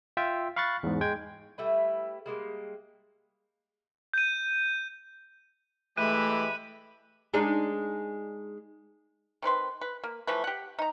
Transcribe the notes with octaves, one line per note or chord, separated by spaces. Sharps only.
F4 E5 G5 E6
F5 B5 C#6 F#6 A6
E2 G#2
G#3 G5 G#6
G3 A3 E4 B4
G3 G#3 A#3
G6 D#7
E3 G#3 A3 G4 E5 B5 F#6 D#7
G#3 D4 D#4
D#3 C4 B4 C6
B4
A#3
E3 F3 A3 B4
G4 F#5
D#4 A#5